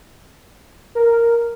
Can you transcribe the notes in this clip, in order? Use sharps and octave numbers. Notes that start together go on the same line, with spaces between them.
A#4